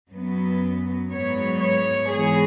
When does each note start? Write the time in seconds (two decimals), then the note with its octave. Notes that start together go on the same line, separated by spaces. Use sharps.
0.10 F#2 F#3 B3
1.11 G#2 F#3 B3 C#5
1.61 C#5
2.12 G#2 E3 G#3 B3 G#4